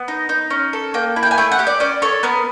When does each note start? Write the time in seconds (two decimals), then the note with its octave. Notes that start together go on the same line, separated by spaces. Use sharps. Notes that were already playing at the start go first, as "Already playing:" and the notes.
Already playing: B3
0.08 D#4
0.29 D#4
0.50 C#4
0.73 A4
0.94 A#3 G5
1.16 E4
1.23 G5
1.31 G#5
1.38 A3 G5
1.51 F#5
1.59 G4
1.67 D5
1.80 C#4 D5
2.02 A4 C#5
2.23 B3 A#4